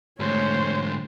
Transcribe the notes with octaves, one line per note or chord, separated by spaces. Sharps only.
G#2 D3 A3 C5 C#5